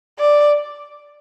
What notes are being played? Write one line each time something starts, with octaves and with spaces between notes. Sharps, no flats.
D5